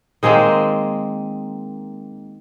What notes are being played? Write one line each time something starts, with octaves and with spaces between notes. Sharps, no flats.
D#3 G#3 A#3 C4